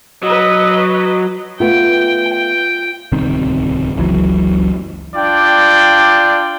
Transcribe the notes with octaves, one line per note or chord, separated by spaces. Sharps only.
F#3 B4 D#5
A3 B3 F4 G5
G5
D1 C2 D#3 C4
F#1 C#2 E3 F#3
D4 F4 D5 G5